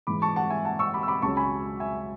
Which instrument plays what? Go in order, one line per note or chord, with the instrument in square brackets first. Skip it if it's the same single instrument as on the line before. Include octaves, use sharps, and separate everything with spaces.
[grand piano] G#2 E3 B5 D6
A5 C#6
F#5 A5
E5 G#5
F#5 A5
C#6 E6
B5 D6
E6
B5 D6
C#2 C#3 F#3 A5 C#6
G#5 B5
E5 G#5